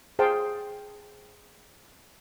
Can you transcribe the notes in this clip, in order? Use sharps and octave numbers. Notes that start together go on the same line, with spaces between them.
G#4 C5 F5 G5 A5